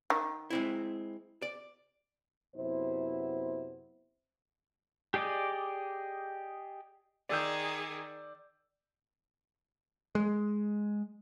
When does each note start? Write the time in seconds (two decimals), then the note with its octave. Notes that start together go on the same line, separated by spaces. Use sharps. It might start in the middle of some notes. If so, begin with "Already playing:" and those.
0.10 D#3
0.50 G#3 C4 E4
1.42 D5
2.56 F#2 C3 B3 E4 C5
5.14 G4 G#4 D5 D#5 D6
7.29 D#3 G#4 D5 E6 G6
10.15 G#3